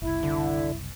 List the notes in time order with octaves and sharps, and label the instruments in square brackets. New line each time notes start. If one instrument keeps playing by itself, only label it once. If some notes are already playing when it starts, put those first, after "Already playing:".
[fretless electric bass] F#1 C2 [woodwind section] E4
[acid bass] D3